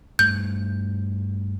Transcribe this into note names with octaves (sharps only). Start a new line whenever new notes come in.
G2 A3 G6